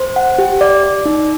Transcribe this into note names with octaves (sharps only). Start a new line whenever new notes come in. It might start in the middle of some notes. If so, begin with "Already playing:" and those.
Already playing: C5
F#5
G4
D5
D5
D#4